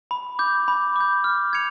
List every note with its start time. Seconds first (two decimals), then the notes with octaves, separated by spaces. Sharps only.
0.11 B5
0.39 D6 G6
0.68 B5
0.96 D6 G6
1.24 F6
1.53 G#6 C#7 F7